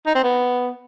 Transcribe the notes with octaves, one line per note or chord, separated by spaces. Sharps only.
D#4
C4
B3